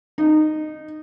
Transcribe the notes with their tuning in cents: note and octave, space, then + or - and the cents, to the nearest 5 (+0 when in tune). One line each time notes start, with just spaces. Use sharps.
D#4 -15